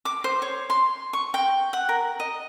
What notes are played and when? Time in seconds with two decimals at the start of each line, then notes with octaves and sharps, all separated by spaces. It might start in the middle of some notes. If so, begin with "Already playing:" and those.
0.05 D6
0.24 C5
0.42 C#5
0.70 C6
1.13 C#6
1.34 G5
1.73 F#5
1.89 A#4
2.20 D#5